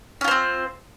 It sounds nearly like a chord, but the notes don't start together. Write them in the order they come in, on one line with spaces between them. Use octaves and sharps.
C#4 F4 C5 C4